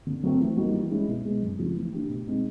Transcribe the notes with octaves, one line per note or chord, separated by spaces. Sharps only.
D3
F#3 A3 C4
E3
G3 A#3 D#4 F#4
E3
G#3 C#4 E4
B2
G#3 B3
F#2
C#3 F3 A3
E3
A3 D4 G4
B2
G#3 C4 D#4